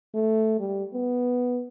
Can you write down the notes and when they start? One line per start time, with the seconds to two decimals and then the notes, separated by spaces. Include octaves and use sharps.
0.14 A3
0.60 G3
0.94 B3